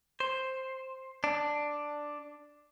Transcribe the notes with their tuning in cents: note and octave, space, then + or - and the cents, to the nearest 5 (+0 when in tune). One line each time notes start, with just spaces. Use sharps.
C5 +5
D4 +5